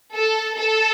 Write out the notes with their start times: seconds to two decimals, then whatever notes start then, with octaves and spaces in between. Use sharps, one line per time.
0.14 A4
0.56 A4